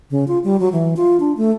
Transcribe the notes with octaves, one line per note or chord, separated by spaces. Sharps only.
C#3
F4
G3
F#3
E3
F4
D4
A3